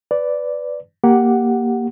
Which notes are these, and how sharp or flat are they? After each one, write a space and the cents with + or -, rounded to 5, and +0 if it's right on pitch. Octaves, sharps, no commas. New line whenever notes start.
B4 +15 D5 -5
A#3 +5 G4 +0 F#5 +0